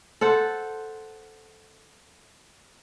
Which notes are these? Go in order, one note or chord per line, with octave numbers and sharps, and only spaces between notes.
A4 C5 F#5